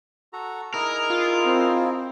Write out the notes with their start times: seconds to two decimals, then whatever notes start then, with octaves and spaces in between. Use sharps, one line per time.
0.33 F#4 A4 A#5
0.74 D#4 E4 G#4 A#4
1.10 F4
1.44 C4